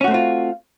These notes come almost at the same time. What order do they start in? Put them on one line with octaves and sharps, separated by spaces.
C#4 F#4 A3 C4 F4